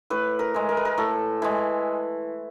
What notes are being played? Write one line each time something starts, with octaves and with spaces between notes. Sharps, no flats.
A2 B4
A#4
E3 G#3
A#4
B4
A#4
A2 A4
E3 G#3